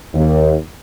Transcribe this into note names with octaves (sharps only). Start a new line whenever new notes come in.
D#2